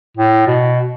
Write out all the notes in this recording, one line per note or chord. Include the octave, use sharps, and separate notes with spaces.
A2
B2